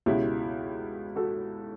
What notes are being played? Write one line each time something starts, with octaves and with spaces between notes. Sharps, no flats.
C#2 B2 E4 G4
F#4 A4